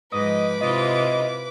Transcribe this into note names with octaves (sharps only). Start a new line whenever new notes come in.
G#2 F3 B4 D#5 D6
C3 E4 F4 D#5